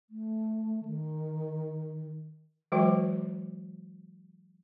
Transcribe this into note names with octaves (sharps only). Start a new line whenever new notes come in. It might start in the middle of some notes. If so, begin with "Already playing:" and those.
A3
D#3
E3 F#3 G#3 F#4 C5 G5